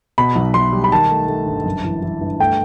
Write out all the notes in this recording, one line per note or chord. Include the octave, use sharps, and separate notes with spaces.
B2 B5
B1
B1 C6
G3
B5
D#3 A5
A3
A3
G1
F#2
E3
E3
G1
A3 G5